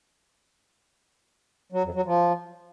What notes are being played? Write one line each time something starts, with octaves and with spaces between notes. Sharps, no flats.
F#3
F2
F#3
F3